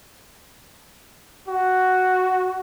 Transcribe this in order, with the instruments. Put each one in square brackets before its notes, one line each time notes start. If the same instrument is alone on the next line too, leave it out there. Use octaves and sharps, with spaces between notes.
[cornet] F#4